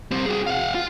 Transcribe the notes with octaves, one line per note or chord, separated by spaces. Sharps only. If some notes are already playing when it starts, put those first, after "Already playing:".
G3 C4
F#4 G#4
F5 F#5
F4